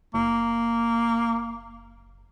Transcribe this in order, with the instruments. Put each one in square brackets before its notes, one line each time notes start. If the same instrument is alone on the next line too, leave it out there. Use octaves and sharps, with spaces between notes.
[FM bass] F#1 [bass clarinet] A#3